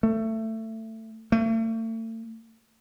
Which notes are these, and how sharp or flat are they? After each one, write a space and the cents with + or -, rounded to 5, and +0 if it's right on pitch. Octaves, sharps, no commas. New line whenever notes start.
A3 +20
A3 +40